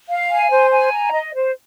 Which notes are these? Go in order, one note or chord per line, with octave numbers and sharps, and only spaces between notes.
F5
G#5
C5
G#5
A#5
D#5
C5